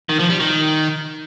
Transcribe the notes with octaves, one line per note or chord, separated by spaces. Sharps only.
D#3
F3
G3
D#3